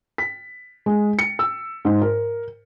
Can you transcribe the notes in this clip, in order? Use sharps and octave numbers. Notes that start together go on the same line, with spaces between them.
B6
G#3
C#7
E6
G#2
A#4